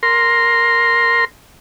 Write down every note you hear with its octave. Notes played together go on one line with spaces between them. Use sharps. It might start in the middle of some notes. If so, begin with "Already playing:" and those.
A#4 C6